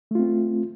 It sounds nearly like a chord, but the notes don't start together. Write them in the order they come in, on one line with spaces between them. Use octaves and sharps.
A3 F4 C4